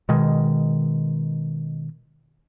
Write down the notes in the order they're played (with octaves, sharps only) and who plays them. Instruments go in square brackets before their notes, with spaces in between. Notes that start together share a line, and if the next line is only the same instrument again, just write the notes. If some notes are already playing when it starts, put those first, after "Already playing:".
[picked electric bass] B2 D#3 G#3